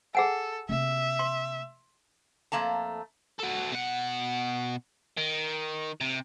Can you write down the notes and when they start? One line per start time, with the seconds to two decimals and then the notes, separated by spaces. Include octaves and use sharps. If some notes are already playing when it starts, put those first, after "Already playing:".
0.15 G#4 A4 F#5 G#5
0.69 C3 A#3 E5
1.19 C6
2.52 F2 A3 A#3 A5 A#5
3.39 F#4 A4
3.72 B2 F#5
5.18 D#3
6.01 C3